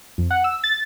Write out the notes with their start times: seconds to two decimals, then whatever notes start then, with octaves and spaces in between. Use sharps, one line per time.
0.18 F2
0.31 F#5
0.44 E6
0.64 A6